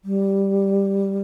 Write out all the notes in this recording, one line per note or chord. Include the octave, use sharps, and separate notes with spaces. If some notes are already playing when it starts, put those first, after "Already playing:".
G3